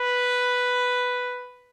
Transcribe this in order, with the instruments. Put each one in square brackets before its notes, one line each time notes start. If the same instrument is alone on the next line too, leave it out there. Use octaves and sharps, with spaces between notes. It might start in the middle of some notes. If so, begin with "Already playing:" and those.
Already playing: [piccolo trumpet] B4